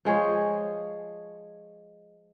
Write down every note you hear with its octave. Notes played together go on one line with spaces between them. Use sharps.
F3 G#3 G#4 C#5